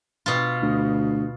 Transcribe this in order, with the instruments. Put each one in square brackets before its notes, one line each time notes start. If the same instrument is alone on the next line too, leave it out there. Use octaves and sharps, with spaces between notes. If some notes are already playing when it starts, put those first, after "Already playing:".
[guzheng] B2 F4
[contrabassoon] D2